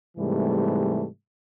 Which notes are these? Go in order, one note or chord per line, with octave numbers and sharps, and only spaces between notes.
G#2 C3 E3 G3 A3